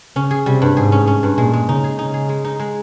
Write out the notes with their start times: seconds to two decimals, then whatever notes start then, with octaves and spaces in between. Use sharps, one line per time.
0.16 C#3 C#4
0.31 G#4
0.46 C3 G3
0.62 G2
0.77 G#2 G#4
0.92 C#4
1.07 C#4
1.23 G2
1.38 A#2 G#3
1.53 G#3
1.68 C#3 D#4
1.84 G#4
1.99 C#3 D#4
2.14 G#4
2.29 G#3
2.45 D#4
2.60 G#3